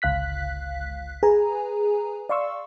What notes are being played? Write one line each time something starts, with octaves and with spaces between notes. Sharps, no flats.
G1 C#2 F5 F#6 B6
G#4 B4 G#5 A#5
D5 F5 C6 C#6 E6